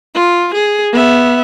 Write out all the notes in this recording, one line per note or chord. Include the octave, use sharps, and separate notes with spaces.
F4
G#4
B3 E5